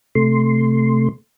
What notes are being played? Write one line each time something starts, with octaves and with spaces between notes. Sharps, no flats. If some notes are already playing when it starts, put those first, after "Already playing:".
C3 A3 C6